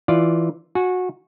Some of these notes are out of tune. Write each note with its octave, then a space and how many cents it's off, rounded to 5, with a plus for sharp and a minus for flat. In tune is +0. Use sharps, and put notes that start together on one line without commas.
E3 +0 F4 +0 D5 +0
F#4 -20 G#5 +0